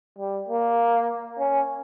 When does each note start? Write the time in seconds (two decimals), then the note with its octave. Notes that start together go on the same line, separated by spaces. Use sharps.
0.19 G3
0.49 A#3
1.39 C#4